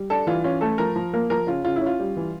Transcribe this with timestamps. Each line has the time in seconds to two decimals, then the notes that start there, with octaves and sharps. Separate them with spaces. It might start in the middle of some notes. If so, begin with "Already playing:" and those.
Already playing: G3
0.10 D4 A4
0.27 E3 F4
0.44 C#4 F4
0.61 A3 A4
0.78 F3 A#4
0.96 F3
1.13 A#3 A#4
1.30 F3 A#4
1.47 C#3 F4
1.64 C#3 F4
1.76 E4
1.81 C#4
1.86 F4
2.00 G3
2.16 E3